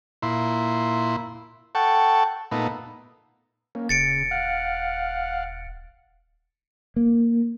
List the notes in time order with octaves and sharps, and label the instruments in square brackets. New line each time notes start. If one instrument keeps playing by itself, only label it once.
[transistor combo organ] A#2 E4 C6
A4 F#5 G5 A5 C#6
A#2 A3 B3 D#4
A#3 C#4
[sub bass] D#1 [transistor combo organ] C#3 [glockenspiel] A6 C#7 D7
[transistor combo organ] F5 F#5
[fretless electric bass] A#3